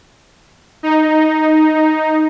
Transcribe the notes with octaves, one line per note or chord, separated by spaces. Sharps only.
D#4